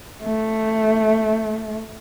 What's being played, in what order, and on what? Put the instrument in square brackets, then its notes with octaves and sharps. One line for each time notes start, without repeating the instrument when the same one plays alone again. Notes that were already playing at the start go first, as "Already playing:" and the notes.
[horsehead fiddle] A3